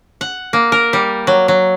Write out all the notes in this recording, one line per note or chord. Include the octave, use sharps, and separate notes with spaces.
F#5
A#3
A#4
G3
F#3
F#3